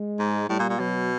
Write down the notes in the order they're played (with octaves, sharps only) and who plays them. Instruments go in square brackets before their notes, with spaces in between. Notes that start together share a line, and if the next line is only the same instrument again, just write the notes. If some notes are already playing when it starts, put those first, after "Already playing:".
Already playing: [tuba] G#3
[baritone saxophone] G#2
[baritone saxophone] A2 [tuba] G3
[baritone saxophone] A#2
A#2
[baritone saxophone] B2 [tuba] F#3